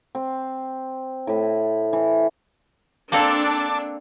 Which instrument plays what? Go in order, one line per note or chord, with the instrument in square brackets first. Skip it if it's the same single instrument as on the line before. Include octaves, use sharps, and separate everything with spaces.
[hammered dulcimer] C4
A2 B5
E3
[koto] A#3 C4 A4 [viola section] D4 [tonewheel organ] A5 D6